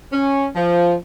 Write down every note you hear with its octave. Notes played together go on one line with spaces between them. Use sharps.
C#4
F3